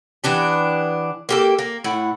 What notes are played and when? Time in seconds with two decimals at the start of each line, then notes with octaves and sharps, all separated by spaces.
0.24 E3 B3 D4 G4
1.29 A#3 G4 A4
1.59 A#3
1.84 A2 E4 F#5